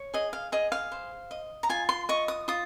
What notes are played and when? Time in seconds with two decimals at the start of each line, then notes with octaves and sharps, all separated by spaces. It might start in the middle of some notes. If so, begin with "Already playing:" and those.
Already playing: C#5
0.14 G#4 D#5
0.33 F5
0.52 G#4 D#5
0.72 F5
0.92 C5
1.31 D#5
1.63 A#5
1.69 F4 G#5
1.89 C6
2.09 D#5 C#6
2.28 D#6
2.48 F4 D#6